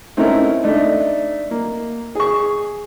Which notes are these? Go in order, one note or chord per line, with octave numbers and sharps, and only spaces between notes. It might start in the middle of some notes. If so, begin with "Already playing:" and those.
A3 C4 C#4 D#4 E4 A#4
A3 D4 D#4
A#3
G#4 C#6